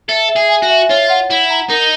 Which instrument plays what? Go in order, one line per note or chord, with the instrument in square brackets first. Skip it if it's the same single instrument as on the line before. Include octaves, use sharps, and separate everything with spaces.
[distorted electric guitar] A4 [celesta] E5
[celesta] E5
[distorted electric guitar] G#4
[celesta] G#5
[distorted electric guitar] F#4
[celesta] E5
[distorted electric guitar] F4 [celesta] C#5
[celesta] F#5
[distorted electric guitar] E4 [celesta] F#5
[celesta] A#5
[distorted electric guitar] D#4 [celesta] A#4